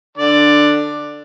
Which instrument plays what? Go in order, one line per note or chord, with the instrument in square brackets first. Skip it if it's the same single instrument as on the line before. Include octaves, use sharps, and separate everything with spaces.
[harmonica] D3 D5